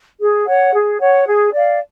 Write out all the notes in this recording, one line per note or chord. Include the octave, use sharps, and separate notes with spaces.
G#4
C#5 F#5
G#4
C#5 F#5
G#4
D5 F5